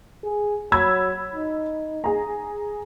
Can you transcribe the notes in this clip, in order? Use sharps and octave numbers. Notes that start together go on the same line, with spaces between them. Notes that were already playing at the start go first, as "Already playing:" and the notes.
G#4
F#3 B5 E6 G#6
D#4
G#4 A#5